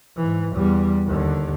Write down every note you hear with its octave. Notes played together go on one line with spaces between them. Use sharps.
G#2 E3
E2 G3
D#2 D3